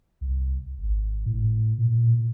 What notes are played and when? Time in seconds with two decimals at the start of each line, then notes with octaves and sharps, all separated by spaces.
0.21 C2
0.79 G#1
1.26 A2
1.78 A#2